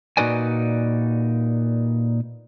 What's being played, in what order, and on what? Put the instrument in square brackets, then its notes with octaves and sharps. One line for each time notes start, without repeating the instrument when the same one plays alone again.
[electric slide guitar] A#2 D#4 F#4 B4 D5 G#5